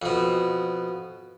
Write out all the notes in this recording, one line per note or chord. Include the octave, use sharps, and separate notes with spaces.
F2 B2